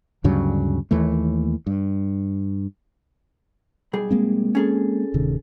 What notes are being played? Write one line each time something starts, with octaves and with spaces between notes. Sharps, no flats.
D2 G2 C#3 F#3
D#2 E3 A3
G2
B1 G3 G#4
G#3 A#3 C4
C#4 G#4 A4
D1 C3 D#3